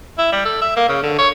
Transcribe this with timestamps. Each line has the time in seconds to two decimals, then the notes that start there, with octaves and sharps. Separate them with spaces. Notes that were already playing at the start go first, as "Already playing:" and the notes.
0.18 E4
0.32 G3
0.45 A4
0.61 E5
0.76 A#3
0.89 C#3
1.03 D3
1.18 C#5